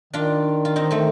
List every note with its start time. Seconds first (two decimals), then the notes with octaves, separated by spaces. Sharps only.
0.13 D#3 D4 F4
0.65 F4
0.76 C4 D#4
0.91 A3 C4